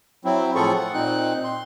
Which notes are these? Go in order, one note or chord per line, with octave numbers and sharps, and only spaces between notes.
F#3 C4 E4
A2 F3 F4 G#4 A4 C#6
F#5
A#2 C4 D#4 F#6
C6